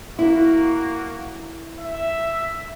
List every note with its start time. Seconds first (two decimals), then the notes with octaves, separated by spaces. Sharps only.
0.19 A#3 E4 F#4
1.79 E5